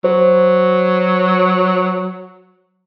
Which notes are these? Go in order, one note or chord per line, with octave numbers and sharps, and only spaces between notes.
F#3 C5